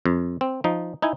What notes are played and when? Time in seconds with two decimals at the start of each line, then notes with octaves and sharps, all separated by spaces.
0.06 F2
0.41 C4
0.64 F3 D#4
1.02 D#4 E4 G#5